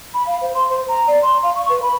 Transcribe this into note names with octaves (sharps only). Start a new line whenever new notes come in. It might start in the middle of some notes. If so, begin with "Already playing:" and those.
B5
F5
C5
C6
C5
A#5
D5
C6
F5
C#6
B4
B5